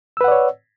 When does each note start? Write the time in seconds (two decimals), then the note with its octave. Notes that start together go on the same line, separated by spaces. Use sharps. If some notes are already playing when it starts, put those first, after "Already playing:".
0.17 E6
0.21 B4
0.24 F#5
0.28 D5
0.32 C#5